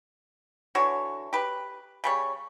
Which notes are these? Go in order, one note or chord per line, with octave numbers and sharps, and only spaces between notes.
D3 E3 F#4 C#5
G4 B4
C#3 G3 C#5